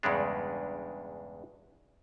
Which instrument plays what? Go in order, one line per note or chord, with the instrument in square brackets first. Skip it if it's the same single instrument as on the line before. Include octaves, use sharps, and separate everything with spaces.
[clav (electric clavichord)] E2 G2 C#3 G#3 D4